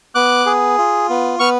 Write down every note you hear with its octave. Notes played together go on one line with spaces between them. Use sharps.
B3 D6 F#6
G#4
F4
B3
B3 C#6 F6